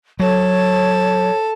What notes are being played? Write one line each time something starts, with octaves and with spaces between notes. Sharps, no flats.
F#3 A4 C#5